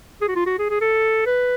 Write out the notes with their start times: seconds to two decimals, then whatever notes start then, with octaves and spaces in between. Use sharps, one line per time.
0.22 G#4
0.28 F#4
0.36 F4
0.46 F#4
0.59 G#4
0.70 G#4
0.81 A4
1.26 B4